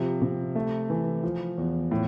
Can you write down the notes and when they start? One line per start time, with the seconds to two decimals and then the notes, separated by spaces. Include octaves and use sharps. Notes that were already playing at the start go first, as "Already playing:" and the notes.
Already playing: C3 F3
0.22 C3
0.55 A3
0.90 E3
1.23 F3
1.58 E2
1.91 A2